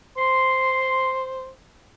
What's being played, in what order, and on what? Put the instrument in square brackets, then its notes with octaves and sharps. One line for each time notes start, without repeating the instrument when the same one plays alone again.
[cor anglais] C5 [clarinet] C6